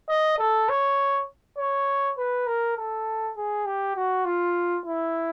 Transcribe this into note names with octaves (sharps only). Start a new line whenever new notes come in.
D#5
A4
C#5
C#5
B4
A#4
A4
G#4
G4
F#4
F4
E4